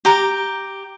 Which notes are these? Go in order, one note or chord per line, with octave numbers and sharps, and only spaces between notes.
G4 A#5 D6